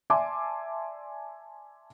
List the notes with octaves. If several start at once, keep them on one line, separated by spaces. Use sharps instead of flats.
D5 E5 G#5 A5 C6 D6